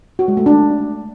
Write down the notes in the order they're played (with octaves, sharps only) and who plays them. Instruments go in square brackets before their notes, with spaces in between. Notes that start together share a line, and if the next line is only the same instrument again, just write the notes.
[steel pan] F#4
G#3
A3
D4